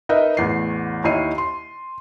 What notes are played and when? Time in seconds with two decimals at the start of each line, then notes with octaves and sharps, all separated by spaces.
0.09 D#4 A#4 B4 D#5 E5
0.37 A1 E2 C7
1.04 D#2 D#4 E4 C#5 C7 D#7
1.38 C6